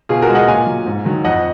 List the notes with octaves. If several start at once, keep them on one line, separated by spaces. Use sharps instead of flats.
B2 F4 G#4
F#4 A#4
G#3
D#5 F#5
A#2 F5 G#5
F#3
G#2
D#3 F#3
F2 D#5 F#5